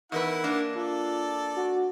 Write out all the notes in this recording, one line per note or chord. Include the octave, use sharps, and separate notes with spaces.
E2 D#4 E4 A#4 B4 F#5
A#3 D4
F4 A4 D5
F#4